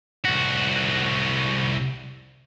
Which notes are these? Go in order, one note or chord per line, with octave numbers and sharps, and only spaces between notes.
C2 F#4